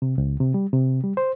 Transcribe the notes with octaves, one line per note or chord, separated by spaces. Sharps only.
C3
C#2
C3
G3
C3
G3
C5